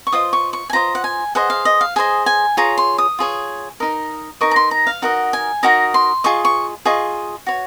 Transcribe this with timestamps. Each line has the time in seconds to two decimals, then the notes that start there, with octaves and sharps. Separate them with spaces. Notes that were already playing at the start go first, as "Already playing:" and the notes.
0.07 C#6
0.13 F4 C5 D#5 D#6
0.33 C#6
0.53 C#6
0.70 G#5
0.73 F4 C5 D#5 A#5
0.95 F#5
1.04 G#5
1.35 G#4 C5 D#5 F#5
1.50 F5
1.65 D#5
1.81 F5
1.96 G#4 C5 D#5 G#5
2.26 G#5
2.57 F4 G#4 C#5 A#5
2.78 C6
2.98 D#6
3.19 F4 G#4 C#5
3.80 D#4 A#4 D#5
4.41 D#4 A#4 D#5 C#6
4.51 A#5
4.56 C6
4.71 A#5
4.87 F5
5.02 D#4 F#4 A#4 D#5 F#5
5.33 G#5
5.63 D#4 F#4 A#4 D#5 A#5
5.94 C6
6.24 F4 G#4 D#5 C#6
6.45 C#6
6.85 F4 G#4 D#5 C#6
7.47 F#4 C#5